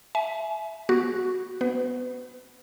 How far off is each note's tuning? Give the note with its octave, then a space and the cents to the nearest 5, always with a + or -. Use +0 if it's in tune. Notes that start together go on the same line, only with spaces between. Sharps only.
E5 +0 G#5 +35
B3 -15 F#4 +0
B3 +0 B4 +35